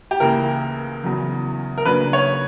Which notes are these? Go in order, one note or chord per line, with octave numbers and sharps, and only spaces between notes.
G4
C#2 C#3 E3 A#3 A#4
E2 C#3 F#3
A#4
C#3 F#3 A#3 D4 B4
C#5